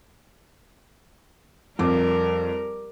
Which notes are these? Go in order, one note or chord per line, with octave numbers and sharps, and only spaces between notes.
F2 G3 A#4 D6